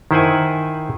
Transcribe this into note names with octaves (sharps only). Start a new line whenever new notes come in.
D#3 E4 C5 F#5 G#5